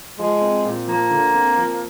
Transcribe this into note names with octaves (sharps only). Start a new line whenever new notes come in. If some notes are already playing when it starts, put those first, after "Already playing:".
F3 G#3
C4
A#2
F3 A#3
D3
C4
F3